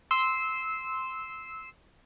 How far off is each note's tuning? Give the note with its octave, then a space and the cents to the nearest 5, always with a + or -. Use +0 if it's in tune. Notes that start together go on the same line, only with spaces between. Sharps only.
C6 +0 E6 -15